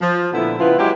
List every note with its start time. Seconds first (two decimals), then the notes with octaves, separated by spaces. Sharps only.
0.01 F3
0.33 A#2 D3 A3 B3 E4
0.59 C#3 F3 B3 E4 F4 B4
0.79 F#3 G#3 D#4 E4 G4